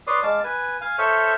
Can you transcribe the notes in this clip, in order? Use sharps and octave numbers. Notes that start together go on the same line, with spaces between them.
B4 C#5 D5 C6 D6 D#6
G#3 F5 A5 D6
B4 G#5
F5 G#5
A4 C5 C#5 E5 C#6 F6